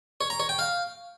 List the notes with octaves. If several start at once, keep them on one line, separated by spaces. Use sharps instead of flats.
C#5
A#5
C#5
G5
F5